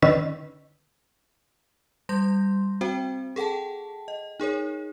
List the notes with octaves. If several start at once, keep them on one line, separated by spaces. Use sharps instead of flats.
D3 D#3 C#4 B4 E6
G3 C6 G6 A#6
C4 F#4 C5 G5
G#4 A4 F#5 G5 A5
D#5
D#4 G#4 A#4 C#5